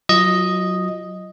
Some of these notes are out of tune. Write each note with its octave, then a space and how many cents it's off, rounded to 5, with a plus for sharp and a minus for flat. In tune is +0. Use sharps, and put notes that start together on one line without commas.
F#3 +0 F4 -35 D#5 +0